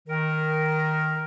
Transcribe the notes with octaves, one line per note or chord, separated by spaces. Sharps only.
D#3 A#4